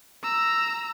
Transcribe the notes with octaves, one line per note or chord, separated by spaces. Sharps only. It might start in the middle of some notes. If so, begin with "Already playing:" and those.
A#5 E6